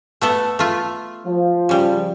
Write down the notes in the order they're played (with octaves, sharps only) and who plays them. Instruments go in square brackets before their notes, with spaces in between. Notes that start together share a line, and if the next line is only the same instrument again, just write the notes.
[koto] A3 B3 A4
A3 F4
[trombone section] F3
[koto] C#3 G3